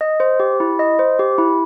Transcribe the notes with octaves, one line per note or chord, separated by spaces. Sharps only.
D#5
C5
G4
E4
D#5
C5
G4
E4